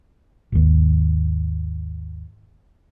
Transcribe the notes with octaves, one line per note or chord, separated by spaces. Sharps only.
G#1 D#2